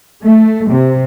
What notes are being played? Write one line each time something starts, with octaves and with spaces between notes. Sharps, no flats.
A3
C3